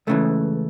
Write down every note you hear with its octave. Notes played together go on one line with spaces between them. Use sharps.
C#2 C#3 E3 A3